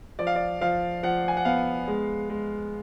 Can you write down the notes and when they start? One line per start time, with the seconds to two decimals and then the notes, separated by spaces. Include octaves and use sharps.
0.19 F3 D5
0.27 F5
0.35 D5
0.61 F3 F5
1.03 F3 F#5
1.28 G#5
1.37 F#5
1.45 B3 F5
1.88 G#3
2.30 G#3